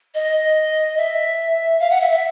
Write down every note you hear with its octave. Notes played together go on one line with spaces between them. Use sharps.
D#5
E5
F5
F#5
E5
E5